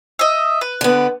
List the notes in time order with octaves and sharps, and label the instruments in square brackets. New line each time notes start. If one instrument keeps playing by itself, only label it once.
[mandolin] D#5 E5
B4
[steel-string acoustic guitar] D3 B3